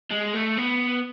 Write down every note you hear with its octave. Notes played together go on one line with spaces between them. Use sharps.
G#3
A3
B3